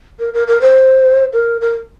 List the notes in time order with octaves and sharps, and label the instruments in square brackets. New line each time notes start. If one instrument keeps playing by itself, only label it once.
[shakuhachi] A#4
A#4
A#4
C5
A#4
A#4